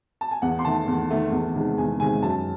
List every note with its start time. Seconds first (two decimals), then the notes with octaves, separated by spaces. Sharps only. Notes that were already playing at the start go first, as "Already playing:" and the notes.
0.21 A5
0.31 G#5
0.42 E2 F#5
0.59 C6
0.65 D#3 A3 A5
0.88 E2
1.10 D#3 A3
1.32 E2
1.55 C3 D#3 G#3
1.78 E2 G#5
2.00 C3 D#3 G#3 G#5
2.22 F#2 A5